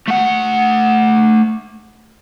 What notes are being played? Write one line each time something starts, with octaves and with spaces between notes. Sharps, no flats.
A3 F#5